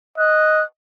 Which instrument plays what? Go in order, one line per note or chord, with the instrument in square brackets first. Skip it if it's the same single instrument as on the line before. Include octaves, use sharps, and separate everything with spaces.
[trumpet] D#5 [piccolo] F#6